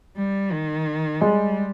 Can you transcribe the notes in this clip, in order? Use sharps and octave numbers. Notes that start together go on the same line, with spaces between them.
G3
D#3
G3 G#3